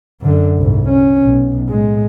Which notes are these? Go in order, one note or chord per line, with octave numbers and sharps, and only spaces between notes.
F#2 D3
C2 G#2
C#4
B1
A2 G#3